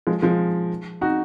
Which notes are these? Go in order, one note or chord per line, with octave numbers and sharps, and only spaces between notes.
F3 G#3
F3 G#3
D#4 F#4